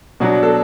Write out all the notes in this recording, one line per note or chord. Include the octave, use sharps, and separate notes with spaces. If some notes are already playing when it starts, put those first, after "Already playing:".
B2 F#3 D4 F#4
A4